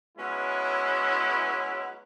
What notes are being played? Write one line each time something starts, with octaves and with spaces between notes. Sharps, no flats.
F#3 G#3 B3 C#4 E4